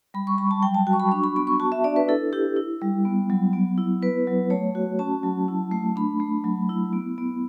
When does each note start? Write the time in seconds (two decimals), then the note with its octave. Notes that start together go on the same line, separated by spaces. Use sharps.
0.14 G3 B5
0.27 C#6
0.38 G3 B5
0.51 A5
0.63 F#3 G5
0.74 A5
0.87 F#4 G5
0.93 C#6
1.00 B5
1.12 D4 C#6
1.24 B5
1.36 B3 B5
1.47 C#6
1.60 F#4 A5
1.72 E5
1.84 D4 D5
1.96 B4
2.08 E4 A4
2.33 E4 G4
2.57 E4
2.81 G3
3.05 B3
3.30 F#3
3.53 B3
3.78 E4
4.02 B3 B4
4.27 F#3
4.50 A3 C#5
4.75 F#4
4.99 C#4 A5
5.23 F#3
5.48 E4
5.71 A3
5.96 D4 B5
6.20 A3
6.44 F#3
6.69 E4
6.93 B3
7.18 B3